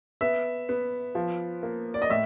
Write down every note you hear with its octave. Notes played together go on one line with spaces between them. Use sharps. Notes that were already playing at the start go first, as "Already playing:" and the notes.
B3 E5
B3
F3
A#3
D5
D#5
A2 E5